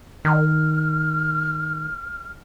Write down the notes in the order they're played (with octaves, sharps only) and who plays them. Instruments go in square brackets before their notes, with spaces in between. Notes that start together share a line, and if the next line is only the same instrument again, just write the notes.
[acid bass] D#3 [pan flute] F6